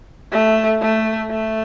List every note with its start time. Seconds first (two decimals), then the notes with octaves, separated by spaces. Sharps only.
0.32 A3
0.81 A3
1.31 A3